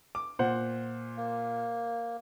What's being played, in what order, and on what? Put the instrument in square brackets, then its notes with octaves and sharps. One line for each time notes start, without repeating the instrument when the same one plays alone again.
[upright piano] D6
[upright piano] A#2 [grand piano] C5 F#5
[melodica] A#3